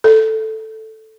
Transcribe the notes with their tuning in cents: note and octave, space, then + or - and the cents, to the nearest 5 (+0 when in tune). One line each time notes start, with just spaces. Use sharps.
A4 +0